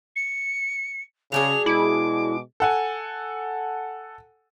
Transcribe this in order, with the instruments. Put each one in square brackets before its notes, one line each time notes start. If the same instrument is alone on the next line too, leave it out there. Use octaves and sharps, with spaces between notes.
[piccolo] C#7
[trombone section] C#3 [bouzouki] F#3 D4 G#4 [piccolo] F7
[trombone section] B2 G#3 [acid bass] E4 [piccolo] D6
[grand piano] A4 F#5 G#5